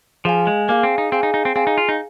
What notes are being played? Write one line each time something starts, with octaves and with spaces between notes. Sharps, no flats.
F3 G#4 F5 G#5
G#3
A#3 G#4 F5 G#5
C4
D#4
C4 G#4 F5 G#5
D#4
D#4
C4
C4 G#4 F5 G#5
D#4
F4
D#4